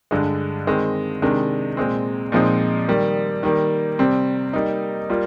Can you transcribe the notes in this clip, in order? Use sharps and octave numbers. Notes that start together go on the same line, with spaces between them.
G2 D3 G#3
D#3 G#3 C4
C3 D#3 G#3 D4
A#2 G#3 C4
A#2 F3 G#3 C4 D#4
D#3 G3 A#3
D#3 G3 A#3
C3 G3 C4
G3 A#3 D#4
G3 A#3 F4